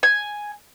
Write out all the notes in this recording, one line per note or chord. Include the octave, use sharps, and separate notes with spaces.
G#5